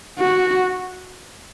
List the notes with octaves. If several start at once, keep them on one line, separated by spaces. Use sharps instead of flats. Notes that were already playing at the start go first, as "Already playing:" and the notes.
F#4